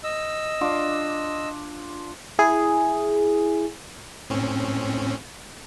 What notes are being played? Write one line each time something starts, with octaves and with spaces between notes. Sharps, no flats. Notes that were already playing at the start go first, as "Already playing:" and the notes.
D#5 E6
D4 F4 D6
E4 G#4
A2 C4 C#4